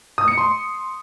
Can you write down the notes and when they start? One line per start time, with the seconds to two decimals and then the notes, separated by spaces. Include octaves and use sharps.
0.18 D#6
0.28 C#7
0.38 C6